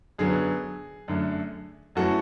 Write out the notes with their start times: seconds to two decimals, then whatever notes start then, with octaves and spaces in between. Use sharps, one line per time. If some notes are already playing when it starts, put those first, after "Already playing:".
0.19 F#2 D3 F#3 B3 G#4
1.08 F#2 D3 A3
1.95 F#2 E3 A3 C#4 F#4 A4